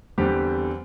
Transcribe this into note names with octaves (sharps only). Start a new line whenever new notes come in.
E2 D3 G3 C4 G4